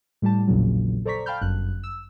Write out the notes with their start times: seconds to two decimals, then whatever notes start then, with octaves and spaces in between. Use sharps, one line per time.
0.22 A2 G3 G4 A5
0.47 A#1 E2 A#2 C#3 F#3
1.05 A4 C5 D5 A#5 C#6 B6
1.26 F5 G5 A5 B5 F6 G6
1.41 G1 F#2 F#6
1.83 E6